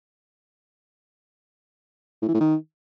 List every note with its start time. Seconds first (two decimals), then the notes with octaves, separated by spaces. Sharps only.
2.22 A2
2.28 E3
2.34 A2
2.40 D#3